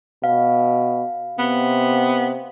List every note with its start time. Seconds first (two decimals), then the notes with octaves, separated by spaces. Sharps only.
0.24 B2 F5
1.39 C3 B3